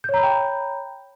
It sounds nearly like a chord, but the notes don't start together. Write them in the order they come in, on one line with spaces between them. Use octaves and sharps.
G6 C#5 A#5 B5 G5